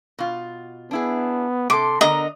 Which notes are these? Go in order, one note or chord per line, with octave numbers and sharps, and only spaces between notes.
B2 F4
B3 D4 E4 G#4
C3 A4 C6 D6
D3 B3 A#4 D#5 A#5